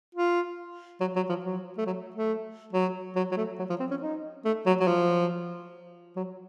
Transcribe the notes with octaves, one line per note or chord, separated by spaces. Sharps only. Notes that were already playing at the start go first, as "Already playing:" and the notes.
F4
F#3
F#3
F3
F#3
A3
F#3
A3
F#3
F#3
F#3
A3
F#3
F3
C4
C#4
D#4
A3
F#3
F#3
F3
F#3